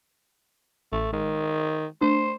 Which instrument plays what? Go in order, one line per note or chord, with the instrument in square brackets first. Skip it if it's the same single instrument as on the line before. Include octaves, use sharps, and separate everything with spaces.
[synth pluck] A1 [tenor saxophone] A3
[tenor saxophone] D#3 [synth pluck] G#3
[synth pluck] A3 D4 [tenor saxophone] C5